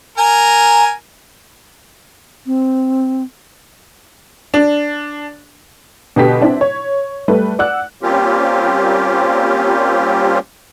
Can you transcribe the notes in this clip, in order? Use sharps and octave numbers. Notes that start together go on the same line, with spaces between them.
A#4 G#5
C4
D4
B2 D3 G4 B4 B6
C4 D4 E4
C#5
G3 A3 B4
D5 F#5 E6 F#6
G3 A#3 C4 C#4 F4 G4